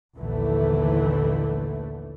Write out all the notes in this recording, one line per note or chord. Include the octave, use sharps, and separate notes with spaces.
A#1 D#2 D3 E3 A3